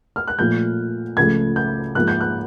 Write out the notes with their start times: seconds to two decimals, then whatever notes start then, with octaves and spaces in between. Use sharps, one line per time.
0.16 F6
0.27 F#6
0.38 A#2 F3 A3 G6
1.17 C#2 C#3 F3 A3 G#6
1.56 G6
1.95 G#2 F3 A#3 F#6
2.08 G6
2.21 F#6